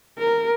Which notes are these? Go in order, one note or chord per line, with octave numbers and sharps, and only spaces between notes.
A#4